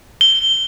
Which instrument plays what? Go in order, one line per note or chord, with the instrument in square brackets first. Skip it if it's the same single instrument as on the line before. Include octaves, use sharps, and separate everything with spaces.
[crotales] G7